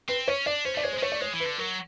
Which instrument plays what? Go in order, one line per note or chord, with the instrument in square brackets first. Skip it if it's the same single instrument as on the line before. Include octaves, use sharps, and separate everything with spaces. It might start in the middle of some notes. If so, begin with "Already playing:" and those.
[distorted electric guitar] C4 [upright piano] B4
[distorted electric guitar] C#4 [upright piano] C#5
[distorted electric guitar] D4 [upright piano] D5
[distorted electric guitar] C#4 [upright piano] C5
[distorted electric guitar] A3 [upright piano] D5
[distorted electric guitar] G#3 [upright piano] C#5
[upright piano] C5
[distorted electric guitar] G#3
[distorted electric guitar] A3 [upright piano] C#5
[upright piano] D5
[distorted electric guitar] G#3 [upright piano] C#5
[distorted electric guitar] E3
[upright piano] B4
[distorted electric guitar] D3
[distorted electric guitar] F#3 [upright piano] A#4